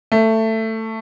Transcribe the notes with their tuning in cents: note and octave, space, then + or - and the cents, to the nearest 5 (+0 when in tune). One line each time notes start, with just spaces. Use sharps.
A3 +15